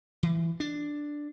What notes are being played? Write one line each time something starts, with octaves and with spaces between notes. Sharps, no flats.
E3
D4